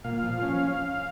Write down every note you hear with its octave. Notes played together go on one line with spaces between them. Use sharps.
A#2 F5
F3
C#4